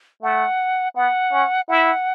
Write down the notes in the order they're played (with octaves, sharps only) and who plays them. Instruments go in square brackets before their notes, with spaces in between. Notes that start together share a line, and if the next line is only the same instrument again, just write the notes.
[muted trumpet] A3 [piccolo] F#5
[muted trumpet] B3 [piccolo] F#5
[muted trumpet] C#4
[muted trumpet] E4 [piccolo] F#5